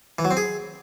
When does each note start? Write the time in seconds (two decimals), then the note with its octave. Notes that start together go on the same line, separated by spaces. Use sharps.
0.19 E3
0.25 F#3
0.31 C4
0.37 G#4